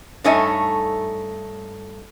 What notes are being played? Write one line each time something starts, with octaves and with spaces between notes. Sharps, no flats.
G2 A3 D#4 C#5 E5 G#5